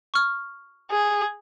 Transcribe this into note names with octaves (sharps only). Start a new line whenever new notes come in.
C#6 F6
G#4